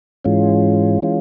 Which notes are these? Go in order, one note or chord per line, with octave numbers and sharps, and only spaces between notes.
G#2 E3 G#3 C#4 F4
E3 G#3 C#4 F4